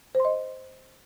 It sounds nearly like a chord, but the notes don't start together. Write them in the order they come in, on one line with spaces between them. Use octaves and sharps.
C5 C6 D#5